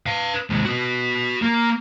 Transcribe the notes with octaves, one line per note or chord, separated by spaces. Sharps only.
B4 F5
D#2 G#3
F#4 B4
A#3